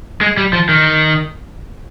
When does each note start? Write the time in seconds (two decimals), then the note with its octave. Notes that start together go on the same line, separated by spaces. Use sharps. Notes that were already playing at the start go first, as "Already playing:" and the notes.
0.21 G#3
0.37 G3
0.53 F3
0.69 D#3